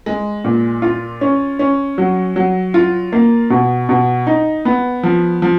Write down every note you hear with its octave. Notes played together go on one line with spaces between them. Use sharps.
G#3
A#2
F4
C#4
C#4
F#3
F#3
F4
A#3
B2
B2
D#4
B3
F3
F3